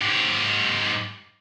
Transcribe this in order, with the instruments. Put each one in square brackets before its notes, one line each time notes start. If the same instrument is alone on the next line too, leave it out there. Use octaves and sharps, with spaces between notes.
[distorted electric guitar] G#2 G4